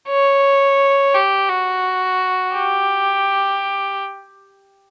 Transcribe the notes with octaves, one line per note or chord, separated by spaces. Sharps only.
C#5
G4
F#4
G4